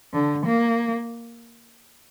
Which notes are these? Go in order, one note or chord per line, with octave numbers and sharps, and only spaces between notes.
D3
A#3